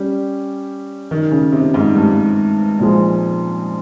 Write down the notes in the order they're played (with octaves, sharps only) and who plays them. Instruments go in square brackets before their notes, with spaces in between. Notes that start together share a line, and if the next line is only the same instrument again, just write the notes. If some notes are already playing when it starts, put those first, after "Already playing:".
Already playing: [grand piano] G3 C#4 G4
[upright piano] D#3
C#3
C3
G#2
G2
[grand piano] A#2 F3 G#3